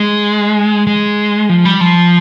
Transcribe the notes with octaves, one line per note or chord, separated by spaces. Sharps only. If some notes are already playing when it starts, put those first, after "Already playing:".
Already playing: G#3
G#3
F3
G3
F3